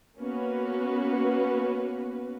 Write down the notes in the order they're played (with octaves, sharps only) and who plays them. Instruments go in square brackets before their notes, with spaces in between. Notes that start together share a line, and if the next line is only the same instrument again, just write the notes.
[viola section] A#3 B3 C#4 F#4 B4